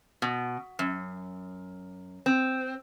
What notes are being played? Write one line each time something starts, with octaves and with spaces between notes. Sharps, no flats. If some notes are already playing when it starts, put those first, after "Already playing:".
B2
F#2
C4